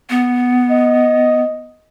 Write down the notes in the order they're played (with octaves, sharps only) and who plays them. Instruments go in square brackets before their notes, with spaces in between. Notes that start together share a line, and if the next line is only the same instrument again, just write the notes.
[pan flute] B3
[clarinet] D#5